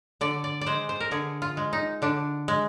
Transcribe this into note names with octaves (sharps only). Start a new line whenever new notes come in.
D3 D5
D5
D5
G#3 C5
C5
A#4
D3 G#4
F4
G#3
D#4
D3 D4
G#3